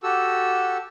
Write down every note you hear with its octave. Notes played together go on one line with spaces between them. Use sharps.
F#4 G4 A4 E6